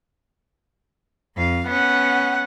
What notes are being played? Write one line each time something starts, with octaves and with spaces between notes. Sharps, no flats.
F2 F5
B3 C#4 F#5